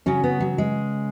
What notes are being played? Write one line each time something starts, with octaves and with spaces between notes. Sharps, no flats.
C#3 F#3 C#4
B3
F#3
G#3